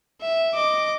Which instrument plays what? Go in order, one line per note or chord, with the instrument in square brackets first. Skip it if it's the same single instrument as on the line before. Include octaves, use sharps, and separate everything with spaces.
[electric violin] E5
D#5 D6